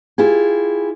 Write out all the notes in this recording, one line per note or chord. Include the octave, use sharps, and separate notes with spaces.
E4 F4 G4 G#4